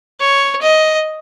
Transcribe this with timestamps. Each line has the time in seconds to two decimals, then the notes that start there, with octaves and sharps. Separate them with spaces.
0.20 C#5
0.62 D#5